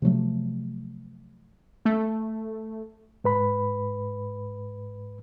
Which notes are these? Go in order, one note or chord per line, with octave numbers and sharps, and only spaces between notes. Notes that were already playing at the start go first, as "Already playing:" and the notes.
C3 F3 F#3 A3
A3
G#2 B4 B5